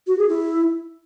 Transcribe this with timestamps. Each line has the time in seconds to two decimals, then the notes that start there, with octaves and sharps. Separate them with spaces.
0.07 F#4
0.18 G#4
0.29 E4